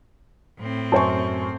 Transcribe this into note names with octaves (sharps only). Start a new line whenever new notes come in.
A2 C4
F#2 C5 G#5 A5 C#6